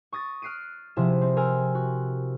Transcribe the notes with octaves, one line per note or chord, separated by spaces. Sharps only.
C#6 D#6 A6 A#6
F6 F#6 C7 D7 D#7
C3 F3 E4 G#4 E7
C4
A#4 G#5 E6
F#4